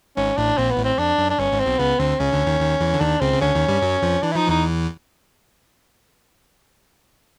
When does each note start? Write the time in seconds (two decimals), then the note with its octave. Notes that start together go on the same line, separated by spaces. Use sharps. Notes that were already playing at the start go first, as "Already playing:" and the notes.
0.17 G#1 G#2 C#4
0.37 A1 A2 D4
0.58 A#1 A#2 C4
0.71 B3
0.77 A1 A2
0.85 C4
0.98 F2 D4
1.19 F#2
1.30 D4
1.39 G1 G2 C#4
1.52 G#1 G#2
1.60 C4
1.66 B1 B2
1.79 C#2 C#3 B3
1.99 D2 D3 C4
2.20 C#2 C#3 C#4
2.33 D2 D3
2.47 D#2 D#3
2.60 D#2 D#3
2.80 E2 E3
2.94 D3
3.00 D#2 D#3 D4
3.21 C#2 C#3 C4
3.33 C#3
3.41 D2 D3 C#4
3.55 D#2 D#3
3.68 G2 G3
3.82 F#2 F#3
4.02 F2 F3
4.23 E3 D4
4.32 E4
4.35 F3 D#4
4.48 E2 E3 D#4